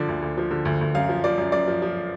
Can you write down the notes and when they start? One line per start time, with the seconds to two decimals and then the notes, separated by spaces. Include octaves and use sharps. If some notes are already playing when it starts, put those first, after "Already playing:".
Already playing: D3 F3 D5
0.08 D2
0.22 D2
0.38 F3
0.51 D3
0.65 D2
0.81 D2
0.95 F#2 F5
1.09 F3
1.24 F3 D5
1.38 F#2
1.52 F#2 D5
1.68 F3
1.82 F3